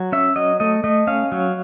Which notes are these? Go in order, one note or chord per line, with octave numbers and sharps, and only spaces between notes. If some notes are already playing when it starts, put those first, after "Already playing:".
Already playing: F#3
C#4 E5
F#3 D#5
A3 D#5
A3 D#5
C#4 F5
F#3